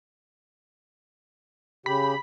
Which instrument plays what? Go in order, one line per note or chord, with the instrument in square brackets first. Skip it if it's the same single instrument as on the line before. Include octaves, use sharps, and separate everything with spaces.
[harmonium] C#3 G4 [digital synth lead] B5